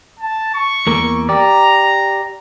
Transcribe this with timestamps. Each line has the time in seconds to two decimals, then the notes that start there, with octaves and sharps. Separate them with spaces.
0.19 A5
0.54 C#6
0.87 E2 A#3
1.29 G4 D5 A#5